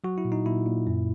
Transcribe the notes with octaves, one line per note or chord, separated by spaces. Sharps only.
F#3 F#4
E4
A#2
D#4
A#2 E4
A#2
F#2